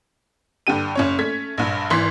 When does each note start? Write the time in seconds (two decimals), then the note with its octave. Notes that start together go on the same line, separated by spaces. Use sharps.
0.67 G2 D3 G4 D#7
0.95 F#1 C#4 C#5
1.19 A3 C#4 G#6 B6
1.58 A#1 G2
1.90 G#1 E3 C6 B6